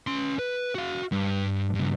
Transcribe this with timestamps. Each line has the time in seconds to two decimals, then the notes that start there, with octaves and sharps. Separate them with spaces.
0.07 C#4 C6
0.39 B4
0.75 F#4 F5
1.12 G2
1.75 G2 C#3